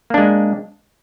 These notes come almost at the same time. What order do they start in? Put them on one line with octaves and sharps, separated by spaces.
A#3 D4 G#3